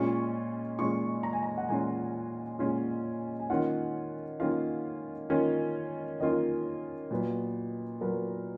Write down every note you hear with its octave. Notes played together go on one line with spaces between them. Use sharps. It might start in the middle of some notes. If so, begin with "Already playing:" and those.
Already playing: A#2 G#3 C#4 F4 C#6
A#2 G#3 C#4 F4 C#6
A#5
G#5
A#5
F#5
A#2 G#3 C#4 F4 G#5
A#2 G#3 C#4 F4
G#5
D#3 A#3 C#4 F4 F#5
D#3 A#3 C#4 F4 F5
D#3 A#3 C#4 F4
D#3 A#3 C#4 F4 D#5
A#2 F#3 B3
A#2 F#3 B3 A#4